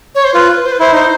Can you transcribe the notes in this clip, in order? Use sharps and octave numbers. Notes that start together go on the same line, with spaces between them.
C#5
C5
F4 B4
C5
B4
E4 C5
D#4 C5